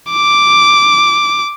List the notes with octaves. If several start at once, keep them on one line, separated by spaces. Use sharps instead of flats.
D6